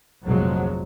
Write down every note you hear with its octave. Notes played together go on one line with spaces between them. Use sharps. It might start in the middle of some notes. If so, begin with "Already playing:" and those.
F1 A#1 F3 F#3 G#3